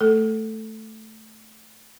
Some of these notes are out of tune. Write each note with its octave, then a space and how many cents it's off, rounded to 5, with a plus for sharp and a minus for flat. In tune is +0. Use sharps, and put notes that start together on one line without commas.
A3 +0 A4 +0